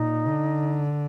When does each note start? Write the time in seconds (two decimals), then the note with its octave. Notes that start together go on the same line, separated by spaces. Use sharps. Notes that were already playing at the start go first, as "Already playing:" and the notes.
Already playing: A#2 D#4
0.27 D3